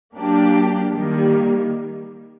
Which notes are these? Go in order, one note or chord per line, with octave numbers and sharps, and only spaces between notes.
F#3 A#3 D4 G4
D#3 G3 A#3